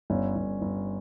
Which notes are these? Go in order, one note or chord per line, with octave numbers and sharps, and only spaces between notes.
G1 C#4
G1
G1